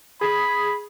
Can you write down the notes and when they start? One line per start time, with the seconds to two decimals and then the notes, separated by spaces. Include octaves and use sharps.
0.21 G#4 B5